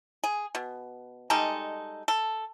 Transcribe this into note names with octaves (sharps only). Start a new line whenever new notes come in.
G#4
B2
G3 G#3 D#4 A4
A4